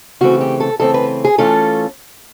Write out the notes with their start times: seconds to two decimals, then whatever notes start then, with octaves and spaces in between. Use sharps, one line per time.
0.21 C#3 E3 A3 C4 F#4
0.41 G4
0.60 A4
0.80 C#3 E3 A3 C4 A4
0.94 B4
1.25 G#4
1.38 E3 A3 C#4 F4 A4